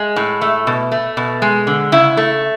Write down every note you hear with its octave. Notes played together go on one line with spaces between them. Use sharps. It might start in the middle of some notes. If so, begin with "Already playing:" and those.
Already playing: G#3
A2
A3
B2
A3
B2
G#3
D3
C#3 E4
A3